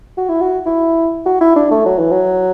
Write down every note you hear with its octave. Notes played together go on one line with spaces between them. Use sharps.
F#4
E4
F#4
E4
F#4
E4
D4
A3
F#3
E3
F#3